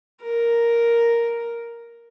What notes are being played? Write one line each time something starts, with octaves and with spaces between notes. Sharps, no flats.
A#4